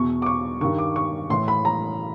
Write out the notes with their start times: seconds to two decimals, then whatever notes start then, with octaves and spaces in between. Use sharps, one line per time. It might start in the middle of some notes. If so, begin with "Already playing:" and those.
Already playing: E2 B2 C#6
0.22 D6
0.26 C#6
0.61 G2 D#3 C#6
0.78 D6
0.96 C#6
1.30 A2 E3 C6
1.48 B5
1.65 A#5